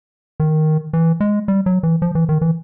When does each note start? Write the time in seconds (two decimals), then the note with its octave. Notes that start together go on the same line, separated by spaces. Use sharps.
0.40 D#3
0.93 E3
1.20 G#3
1.48 G3
1.66 F#3
1.83 E3
2.02 F3
2.15 E3
2.29 D#3
2.41 E3